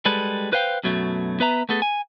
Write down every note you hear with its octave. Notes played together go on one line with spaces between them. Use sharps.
G3 G#3 A4 B4
B4 C5 F5 G5
F#2 B2 F#3 A3
B3 B4 E5 A#5
A3 B3 G#4 A4
G#5